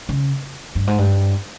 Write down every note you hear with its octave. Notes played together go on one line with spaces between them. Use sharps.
C#3
G2
G#2
G2